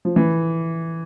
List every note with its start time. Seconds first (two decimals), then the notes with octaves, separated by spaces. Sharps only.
0.05 F3
0.16 E3